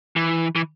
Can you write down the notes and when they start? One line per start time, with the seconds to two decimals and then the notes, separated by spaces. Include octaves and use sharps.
0.16 E3
0.56 E3